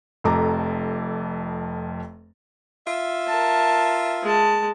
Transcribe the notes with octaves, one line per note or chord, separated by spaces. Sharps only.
F1 F2 A4 A#5 D6
F4 E5
A#4 A5
G#3 A5